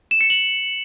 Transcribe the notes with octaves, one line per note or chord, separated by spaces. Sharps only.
E7
C#7
F#7